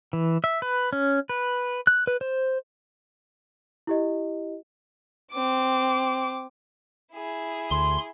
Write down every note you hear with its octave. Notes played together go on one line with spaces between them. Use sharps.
E3
E5
B4
C#4
B4
F#6
B4
C5
E4 G4 D#5
C4 D6
E4 G#4
D2 C6